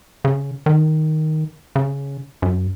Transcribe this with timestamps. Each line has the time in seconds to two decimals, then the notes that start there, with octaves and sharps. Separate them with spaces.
0.25 C#3
0.66 D#3
1.76 C#3
2.42 F#2